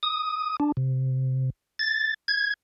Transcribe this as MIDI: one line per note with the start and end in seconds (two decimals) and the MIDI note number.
0.03 0.57 87
0.60 0.72 62
0.77 1.50 48
1.79 2.14 93
2.28 2.54 92